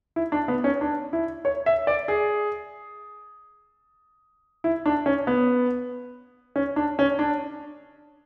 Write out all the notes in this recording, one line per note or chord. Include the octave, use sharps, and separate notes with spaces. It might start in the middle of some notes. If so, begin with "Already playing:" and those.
E4
D4
B3
C#4
D4
E4
C#5
E5
D5
G#4
E4
D4
C#4
B3
C#4
D4
C#4
D4